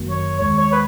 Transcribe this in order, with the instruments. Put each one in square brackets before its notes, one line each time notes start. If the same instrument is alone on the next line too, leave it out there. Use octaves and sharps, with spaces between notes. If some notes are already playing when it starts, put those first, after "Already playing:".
Already playing: [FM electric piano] G1 F#2 D#3 F#3 A#3
[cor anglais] C#5
[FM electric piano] D#2 D#3 G#3 [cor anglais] C#5
[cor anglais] C#5
B4